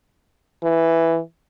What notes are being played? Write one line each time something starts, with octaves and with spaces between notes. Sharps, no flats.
E3